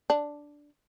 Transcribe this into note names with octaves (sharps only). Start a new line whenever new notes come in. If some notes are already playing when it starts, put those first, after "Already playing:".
D4